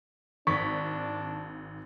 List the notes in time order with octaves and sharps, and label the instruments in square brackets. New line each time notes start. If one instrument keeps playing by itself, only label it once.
[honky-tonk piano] G#1 B6 [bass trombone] D4 [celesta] C#6